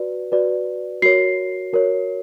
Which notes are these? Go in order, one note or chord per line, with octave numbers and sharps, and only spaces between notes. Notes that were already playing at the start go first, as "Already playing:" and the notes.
Already playing: F#4 B4 D5
F#4 B4 D5
F#4 A#4 C#5 C7
F#4 A#4 C#5